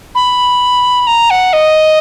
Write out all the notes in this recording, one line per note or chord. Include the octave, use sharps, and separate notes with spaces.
B5
A#5
F#5
D#5